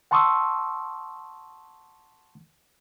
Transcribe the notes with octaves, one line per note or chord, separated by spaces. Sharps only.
F#5 A5 C6 C#6 D#6 E6